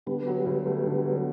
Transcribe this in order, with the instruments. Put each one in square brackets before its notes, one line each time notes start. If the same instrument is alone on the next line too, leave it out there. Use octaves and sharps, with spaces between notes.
[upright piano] D3 [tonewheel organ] G3 B3
[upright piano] F#3
D2
A3
D3
F#3